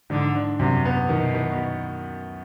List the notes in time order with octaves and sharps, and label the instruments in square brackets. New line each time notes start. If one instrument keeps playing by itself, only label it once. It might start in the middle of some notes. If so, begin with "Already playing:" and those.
[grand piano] G#2 [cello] D3
[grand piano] D4
[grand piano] F#2 [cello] C3
[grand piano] B3
[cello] B2 [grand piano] D#3
[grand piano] D#3